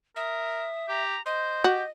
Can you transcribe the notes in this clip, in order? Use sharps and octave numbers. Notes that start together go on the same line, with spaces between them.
A#4 E5 D#6
G4 A#5
C5 D#5 G6
F#4 G4